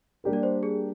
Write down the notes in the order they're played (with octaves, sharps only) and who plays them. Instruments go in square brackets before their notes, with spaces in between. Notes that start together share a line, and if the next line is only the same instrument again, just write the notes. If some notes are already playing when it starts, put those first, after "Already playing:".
[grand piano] G3 A#3 D4 G4 A#4
[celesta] D5
C5
G#4